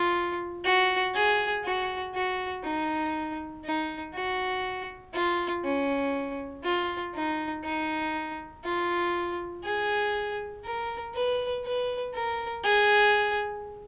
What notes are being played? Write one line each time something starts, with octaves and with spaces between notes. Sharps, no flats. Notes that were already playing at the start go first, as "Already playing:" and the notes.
Already playing: F4
F#4
G#4
F#4
F#4
D#4
D#4
F#4
F4
C#4
F4
D#4
D#4
F4
G#4
A#4
B4
B4
A#4
G#4